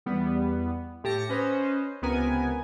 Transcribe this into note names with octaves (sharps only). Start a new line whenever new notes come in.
E2 G3 B3
A2 G4 A5 A#6 C#7
C#4 B4 C5 D#5
C#2 C3 B3 A#4 G#5